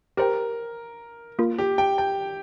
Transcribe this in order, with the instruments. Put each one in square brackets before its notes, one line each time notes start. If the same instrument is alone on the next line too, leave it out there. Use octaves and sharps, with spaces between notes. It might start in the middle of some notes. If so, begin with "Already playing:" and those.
[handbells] G4 C5 G5 [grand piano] A#4
[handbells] A#3 F4 A#4
[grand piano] G4
G5
G5